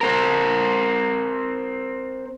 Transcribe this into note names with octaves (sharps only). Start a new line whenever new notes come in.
C4 A#4